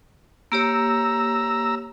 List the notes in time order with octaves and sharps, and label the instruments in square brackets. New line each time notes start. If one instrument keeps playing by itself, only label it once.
[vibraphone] A#3 G4 C#5 [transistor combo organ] A#5 E6